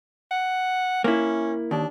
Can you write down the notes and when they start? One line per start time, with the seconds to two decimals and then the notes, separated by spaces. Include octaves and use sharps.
0.31 F#5
1.04 A#3 C#4 E4
1.71 D#2 D4